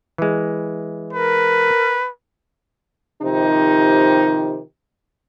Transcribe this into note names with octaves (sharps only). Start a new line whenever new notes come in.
E3 G#3
A#4 B4
C3 D#3 F3 D#4 G4